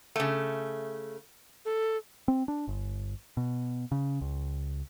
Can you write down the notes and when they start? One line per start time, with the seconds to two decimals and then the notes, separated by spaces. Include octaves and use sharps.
0.16 C#3 A3
1.65 A4
2.28 C4
2.48 D4
2.68 G1
3.37 B2
3.92 C#3
4.21 C#2